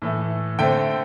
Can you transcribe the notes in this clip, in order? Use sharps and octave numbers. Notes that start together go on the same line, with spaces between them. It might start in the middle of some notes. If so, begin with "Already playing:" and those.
A2 E3 A3
D3 A3 C4 G5